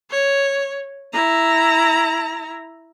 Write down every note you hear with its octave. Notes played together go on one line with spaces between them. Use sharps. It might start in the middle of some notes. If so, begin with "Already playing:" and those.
C#5
E4 A#5